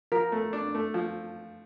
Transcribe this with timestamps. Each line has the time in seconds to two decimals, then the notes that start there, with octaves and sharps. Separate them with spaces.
0.12 F3 A#4
0.32 A3
0.53 D4
0.75 A3
0.94 F3